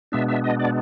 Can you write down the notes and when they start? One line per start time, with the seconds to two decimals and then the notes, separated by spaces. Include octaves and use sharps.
0.12 B2 G#3 B3 D4 E5
0.28 E5
0.44 D#5
0.60 D5